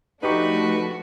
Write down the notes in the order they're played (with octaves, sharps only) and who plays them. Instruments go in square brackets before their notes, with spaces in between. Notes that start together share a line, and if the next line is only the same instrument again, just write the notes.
[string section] F3 A3 D4 [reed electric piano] D#4 G4 C#6 [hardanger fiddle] F#4 [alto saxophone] B4